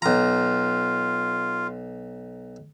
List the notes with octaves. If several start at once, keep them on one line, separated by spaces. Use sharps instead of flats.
B1 F4 A#5